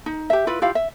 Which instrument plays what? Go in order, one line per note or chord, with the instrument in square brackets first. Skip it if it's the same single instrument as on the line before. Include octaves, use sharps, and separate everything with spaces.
[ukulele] D#4
G4 E5
E4 F4 B4
E4 F4 G4 F5
E5